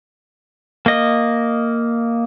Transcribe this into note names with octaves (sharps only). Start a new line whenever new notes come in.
A#3 D#5